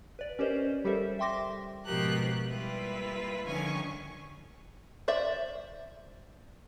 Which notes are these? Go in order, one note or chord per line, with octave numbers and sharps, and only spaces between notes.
B4 D5
C#4 G4 A#4 C5 C#5 D#5
G3 G4 A4 A#4 C5 E5
E5 G5 C6 D6 A#6
G#2 B2 F3 G4 A#4 F#6
G3 A#3 E4 F4 B4
D3 D#3 F3 C#4 G#5 C#6
C5 D5 E5